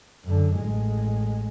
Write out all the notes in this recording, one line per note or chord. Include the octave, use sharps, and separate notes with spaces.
F#2 D3
A1 G#3